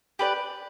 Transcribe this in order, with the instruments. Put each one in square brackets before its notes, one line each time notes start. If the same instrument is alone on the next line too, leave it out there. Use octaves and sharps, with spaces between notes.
[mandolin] G4 B4 D5